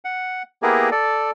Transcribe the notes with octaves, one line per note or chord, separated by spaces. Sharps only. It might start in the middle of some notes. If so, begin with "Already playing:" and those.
F#5
A#3 B3 E4 G4 G#4 A#4
A4 D5